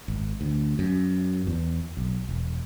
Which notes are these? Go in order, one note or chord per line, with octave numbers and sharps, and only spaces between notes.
G#1
D2
F#2
E2
B1
E1